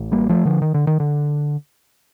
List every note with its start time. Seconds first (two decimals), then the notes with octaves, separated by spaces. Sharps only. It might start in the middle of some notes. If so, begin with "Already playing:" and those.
Already playing: A1 A2
0.12 G3 A#3
0.29 F3 A3
0.45 D3 F3
0.62 D#3
0.74 D3
0.87 D#3
1.00 D3